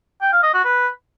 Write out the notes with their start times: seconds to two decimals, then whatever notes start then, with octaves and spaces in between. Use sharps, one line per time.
0.22 G5
0.32 F5
0.43 D#5
0.54 F#4
0.64 B4